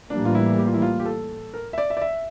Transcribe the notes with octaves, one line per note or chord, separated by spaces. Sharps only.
A2 E3 G3 A#3 D4
F4
E4
G4
F4
E4
F4
G4
A4
A#4
E5
D5
E5
D5
E5